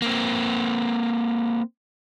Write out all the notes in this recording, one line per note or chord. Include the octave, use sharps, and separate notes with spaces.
A#3 C4